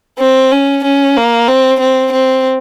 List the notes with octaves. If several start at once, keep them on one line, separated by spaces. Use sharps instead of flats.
C4
C#4
C#4
A#3
C4
C4
C4